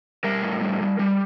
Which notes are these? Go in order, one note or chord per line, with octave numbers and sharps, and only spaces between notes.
G3 A#4
A2
G3
G3
G3